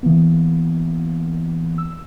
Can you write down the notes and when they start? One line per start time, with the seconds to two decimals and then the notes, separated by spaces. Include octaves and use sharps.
0.03 E3 A#3 B3
1.78 E6